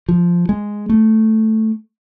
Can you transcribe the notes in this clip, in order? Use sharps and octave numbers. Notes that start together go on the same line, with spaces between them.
F3
G#3
A3